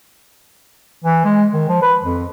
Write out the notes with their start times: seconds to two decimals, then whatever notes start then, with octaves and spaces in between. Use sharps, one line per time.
1.04 E3
1.25 G#3
1.53 D#3
1.69 F3
1.82 B4
2.03 F2